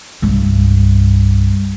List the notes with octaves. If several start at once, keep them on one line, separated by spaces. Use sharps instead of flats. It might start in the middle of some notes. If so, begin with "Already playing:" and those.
C2 G2